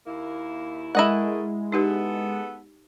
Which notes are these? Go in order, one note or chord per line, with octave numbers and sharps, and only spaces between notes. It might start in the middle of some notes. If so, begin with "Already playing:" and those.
D#2 A#3 E4
G#3 A3 E4 G#4 A#4 D#5 F#5
B3 D#4 G4 A4 B4